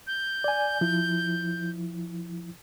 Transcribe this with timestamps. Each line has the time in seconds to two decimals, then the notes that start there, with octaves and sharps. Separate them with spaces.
0.07 G6
0.44 D5 G#5
0.81 F3 E4